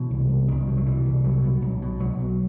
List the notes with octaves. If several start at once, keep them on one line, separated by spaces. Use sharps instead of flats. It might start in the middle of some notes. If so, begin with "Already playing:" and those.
Already playing: B2 E3
C2
C2
C2 D#3
B2
F#3
B2 E3
C2
B2 F#3
B2
B1
B2
B1 F#3
B1